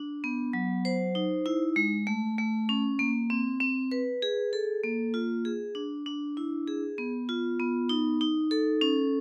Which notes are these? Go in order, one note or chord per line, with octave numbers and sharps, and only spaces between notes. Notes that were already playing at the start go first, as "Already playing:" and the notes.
Already playing: D4
B3
F#3
C5
D#4
E4
G#3
A3
A3
C#4
A#3
C4
C4
B4
G#4
A4
A#3
F4
G#4
D4
D4
E4
G#4
B3
F4
B3
D#4
D#4
A4
C#4